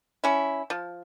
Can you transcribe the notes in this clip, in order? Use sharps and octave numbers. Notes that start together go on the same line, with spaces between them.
C#4 E4
F3